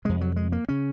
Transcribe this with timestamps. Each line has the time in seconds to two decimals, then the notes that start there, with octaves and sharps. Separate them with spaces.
0.05 F2 C3 G#3
0.21 F#3
0.36 G#3
0.52 A#3
0.69 C#3 C#4